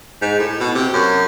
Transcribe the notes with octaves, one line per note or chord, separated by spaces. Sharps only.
G#2
A2
B2
C3
F#2